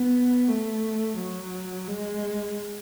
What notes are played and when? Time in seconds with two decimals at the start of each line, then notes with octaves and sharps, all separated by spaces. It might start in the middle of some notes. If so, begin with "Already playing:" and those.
Already playing: B3
0.48 A3
1.18 F#3
1.88 G#3